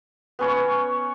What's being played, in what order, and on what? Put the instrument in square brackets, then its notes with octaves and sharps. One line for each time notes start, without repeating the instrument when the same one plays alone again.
[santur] B3 C#4 C#5